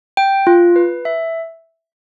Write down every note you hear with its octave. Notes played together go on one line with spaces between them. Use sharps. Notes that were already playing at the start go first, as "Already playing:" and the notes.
G5
F4
B4
E5